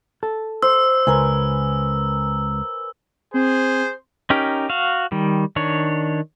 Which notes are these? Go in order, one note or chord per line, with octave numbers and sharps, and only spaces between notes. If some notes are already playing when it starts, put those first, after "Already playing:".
A4
C5 E6
C#2 A#4 B4 G#5
C4 G#4 C5
C#4 D#4 G4 A#4
F#4 F5
D#3 G3
D#3 D4 C#5